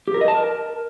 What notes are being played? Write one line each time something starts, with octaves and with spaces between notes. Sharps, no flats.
G4
A#4
D#5
A5
A#4